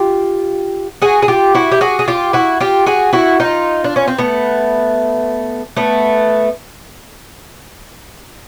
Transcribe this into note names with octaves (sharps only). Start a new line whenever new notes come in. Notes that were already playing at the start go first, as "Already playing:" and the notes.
Already playing: F4 G4
F#4 G#4
G#4
F4 G4
E4 F#4
G4
F#4 G#4
G#4
F4 G4
E4 F#4
F4 G4
F#4 G#4
E4 F#4
D#4 F4
D4
C#4
C4
A3 B3
A3 B3